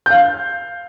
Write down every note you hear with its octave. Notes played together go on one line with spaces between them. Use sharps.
F5 G6